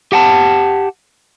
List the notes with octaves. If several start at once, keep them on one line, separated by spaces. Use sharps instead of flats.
G4 F#5 G#5 A5